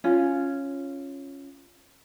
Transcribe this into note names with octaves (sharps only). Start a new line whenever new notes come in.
C#4 F4